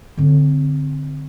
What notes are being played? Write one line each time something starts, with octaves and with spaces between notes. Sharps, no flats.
D3 C4